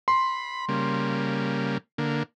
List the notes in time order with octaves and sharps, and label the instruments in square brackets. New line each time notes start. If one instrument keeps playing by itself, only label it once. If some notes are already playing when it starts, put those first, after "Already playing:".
[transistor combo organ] B5 [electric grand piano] C6
[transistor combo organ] C#3 G3 A#3
D3 A#3